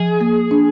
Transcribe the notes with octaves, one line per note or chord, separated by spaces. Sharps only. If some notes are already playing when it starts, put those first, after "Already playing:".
Already playing: F3 G#4
A#3
D4